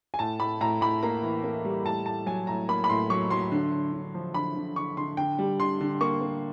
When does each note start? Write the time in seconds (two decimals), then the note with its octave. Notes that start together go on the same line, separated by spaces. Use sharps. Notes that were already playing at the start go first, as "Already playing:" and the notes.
0.14 G#5
0.19 A2 A5
0.40 A2 B5
0.61 A2 A#5
0.81 A2 B5
1.03 A#3 A#5
1.23 E3
1.44 A#3
1.65 G3
1.85 A2 A5
2.06 A2 A5
2.26 F#3 G#5
2.47 A2 A#5
2.69 A#3 B5
2.84 B5
2.89 A2 C6
3.10 F#3 C#6
3.30 F#3 C6
3.52 D3
3.72 D3
3.93 D3
4.14 F3
4.34 D3 B5
4.56 D3
4.76 D3 C#6
4.97 D3 C6
5.17 D3 G5
5.39 G3
5.60 D3 C6
5.81 D3
6.01 A#3 C#6
6.22 A#3